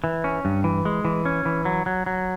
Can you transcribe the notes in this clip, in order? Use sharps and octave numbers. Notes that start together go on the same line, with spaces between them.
E3
C#4
G2
E3
G#3
E3
C#4
E3
F#3
F#3
F#3